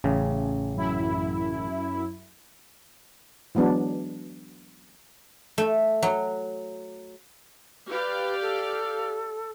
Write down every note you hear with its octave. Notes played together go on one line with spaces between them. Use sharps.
A1 C#3
F#2 E4
E3 F#3 G#3 B3 D4
A3
F#3
G4 B4 D5 F5
A4